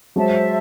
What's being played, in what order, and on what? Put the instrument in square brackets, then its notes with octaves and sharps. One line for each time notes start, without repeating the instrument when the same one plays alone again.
[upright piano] F#3 G#3 [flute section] C5 E5 A5